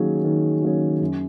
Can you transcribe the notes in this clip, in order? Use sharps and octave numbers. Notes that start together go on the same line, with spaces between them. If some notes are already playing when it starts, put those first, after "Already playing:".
Already playing: D#3 F#3 A#3 C#4 G#4
D#3
F#3 A#3 C#4 G#4
F#2